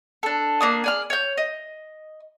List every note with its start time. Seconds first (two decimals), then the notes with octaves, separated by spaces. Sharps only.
0.23 D4 A4
0.61 A#3 D4 D#6
0.84 G#4 D5 F6
1.10 C#5 G6
1.37 D#5